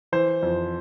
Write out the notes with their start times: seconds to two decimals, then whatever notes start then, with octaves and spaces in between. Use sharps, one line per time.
0.12 E3 C5
0.43 F2